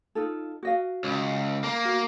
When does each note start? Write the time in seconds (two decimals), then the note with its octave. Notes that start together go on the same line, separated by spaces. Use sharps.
0.15 D#4 F4 A4
0.63 F#4 D#5 F5
1.04 C#2
1.64 A#3 A#5
1.85 F#4